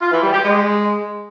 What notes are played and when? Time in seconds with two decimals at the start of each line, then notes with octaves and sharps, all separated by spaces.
0.01 F4
0.12 E3
0.22 G3
0.33 G4
0.44 G#3